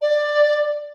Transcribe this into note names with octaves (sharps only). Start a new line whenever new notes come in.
D5